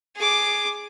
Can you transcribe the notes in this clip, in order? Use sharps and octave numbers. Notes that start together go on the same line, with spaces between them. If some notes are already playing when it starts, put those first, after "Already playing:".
G#4 D6